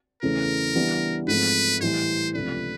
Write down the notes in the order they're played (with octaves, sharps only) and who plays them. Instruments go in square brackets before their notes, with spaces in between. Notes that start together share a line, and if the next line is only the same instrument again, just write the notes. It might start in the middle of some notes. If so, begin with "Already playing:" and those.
[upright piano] E2 C#3 E3 A3 C#4 [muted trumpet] A#4
[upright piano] C#3 E3 G3 B3 D4
[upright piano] G#2 F3 A3 C4 [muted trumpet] B4
[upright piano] A2 E3 G3 [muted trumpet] C5
[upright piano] C#2 C3 F3 A3 D4 [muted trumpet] B4